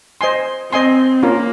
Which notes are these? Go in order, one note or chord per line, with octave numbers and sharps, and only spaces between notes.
C5 D#5 G#5 C6
C4 C5 D#5 G#5 C6
A#3 C#4 F4 A#4